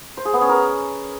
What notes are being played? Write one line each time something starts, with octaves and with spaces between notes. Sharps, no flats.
C5
G#4
B3
C#4
A#4